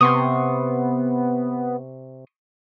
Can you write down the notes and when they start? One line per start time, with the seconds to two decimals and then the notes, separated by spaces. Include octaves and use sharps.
0.01 C3 B3 C6 C#6 D#6